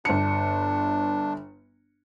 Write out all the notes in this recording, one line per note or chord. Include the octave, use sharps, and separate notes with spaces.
G1 D4 C#7